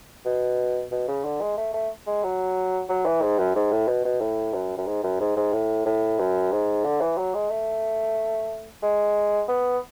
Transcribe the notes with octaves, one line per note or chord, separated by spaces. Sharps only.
B2
B2
C#3
D3
G#3
A3
A3
G#3
F#3
F#3
E3
G#2
F#2
G#2
A2
B2
B2
A2
F#2
F#2
G#2
F#2
G#2
G#2
A2
A2
F#2
G#2
D3
E3
F#3
G#3
A3
G#3
B3